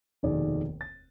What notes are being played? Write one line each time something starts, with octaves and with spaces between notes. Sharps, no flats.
F1 D#2 B2 D#3 G#4 D5
A6